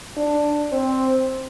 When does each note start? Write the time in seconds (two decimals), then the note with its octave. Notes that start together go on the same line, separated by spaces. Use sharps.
0.17 D4
0.72 C4